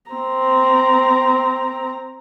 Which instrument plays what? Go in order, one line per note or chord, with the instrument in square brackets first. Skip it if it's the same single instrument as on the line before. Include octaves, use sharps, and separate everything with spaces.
[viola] C4 A#5